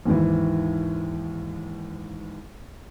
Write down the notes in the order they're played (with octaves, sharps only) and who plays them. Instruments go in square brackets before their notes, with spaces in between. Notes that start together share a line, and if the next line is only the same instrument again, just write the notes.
[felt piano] D#2 G#2 E3